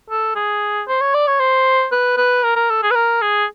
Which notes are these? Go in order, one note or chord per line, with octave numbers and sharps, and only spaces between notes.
A4
G#4
C5
C#5
D5
C#5
C5
B4
B4
A#4
A#4
A4
G#4
B4
A#4
G#4